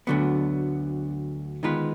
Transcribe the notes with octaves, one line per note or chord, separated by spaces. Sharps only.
D2 D3 F#3 B3
D#3 G#3 B3 F4 B4